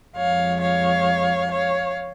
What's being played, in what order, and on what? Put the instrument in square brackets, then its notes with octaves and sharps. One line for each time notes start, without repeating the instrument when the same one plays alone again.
[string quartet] F2 F3 G#3 C#5 F5
C#5 F5
C#5 F5